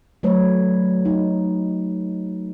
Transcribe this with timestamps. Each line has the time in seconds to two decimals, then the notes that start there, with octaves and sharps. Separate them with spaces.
0.23 F#3 A3 B4 C#5
1.05 D#4